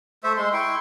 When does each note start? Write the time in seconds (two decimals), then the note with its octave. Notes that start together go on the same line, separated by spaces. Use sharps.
0.24 A3 A4 C5 E5
0.37 G#3 C6
0.53 E4 G5 C6 C#6